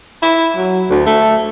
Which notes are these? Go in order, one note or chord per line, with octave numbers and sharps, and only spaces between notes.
E4
F#3
D2
A3